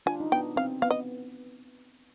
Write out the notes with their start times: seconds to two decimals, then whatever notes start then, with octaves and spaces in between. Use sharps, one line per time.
0.06 D4 F4 G#5
0.20 D#4
0.32 B3 D4 G5
0.56 C4 F5
0.82 B3 F5
0.90 D#5